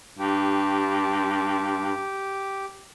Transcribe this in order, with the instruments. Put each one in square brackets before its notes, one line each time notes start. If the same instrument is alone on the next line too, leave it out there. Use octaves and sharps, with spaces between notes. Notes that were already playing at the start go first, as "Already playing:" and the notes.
[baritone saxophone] G2 [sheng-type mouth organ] G4